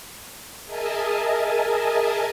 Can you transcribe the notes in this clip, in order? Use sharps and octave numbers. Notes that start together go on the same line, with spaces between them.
G#4 A#4 D#5 E5 G#5 A5